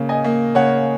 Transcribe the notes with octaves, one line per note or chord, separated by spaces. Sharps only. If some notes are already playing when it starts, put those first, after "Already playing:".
Already playing: C#3 A#3
D#5 G#5
A#3
C#3 C#5 F#5